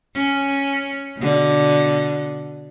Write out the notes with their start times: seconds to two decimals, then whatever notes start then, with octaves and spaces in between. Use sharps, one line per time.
0.15 C#4
1.18 B2 D3